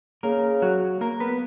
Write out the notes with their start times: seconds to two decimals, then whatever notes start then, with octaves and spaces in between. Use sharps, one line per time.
0.23 C#3 A#3 A#4
0.62 F#3 F#4
1.01 A#3 A#4
1.20 B3 B4